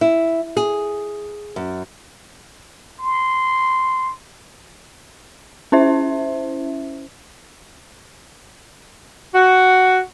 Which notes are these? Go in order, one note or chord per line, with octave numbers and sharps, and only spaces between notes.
E4
G#4
F#2
C6
C#4 E4 C5 E5
F#4